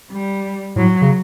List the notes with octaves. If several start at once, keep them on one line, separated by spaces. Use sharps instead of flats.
G3
A2 F#3
C#3